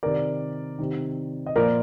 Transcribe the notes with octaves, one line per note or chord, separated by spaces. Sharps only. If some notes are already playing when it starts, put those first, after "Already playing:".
C3 D#3 A#4 D5
C3 D#3
D#5
A#2 F3 A#4 D5